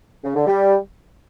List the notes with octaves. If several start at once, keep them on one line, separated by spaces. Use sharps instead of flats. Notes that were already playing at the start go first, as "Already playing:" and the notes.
C#3
D3
G3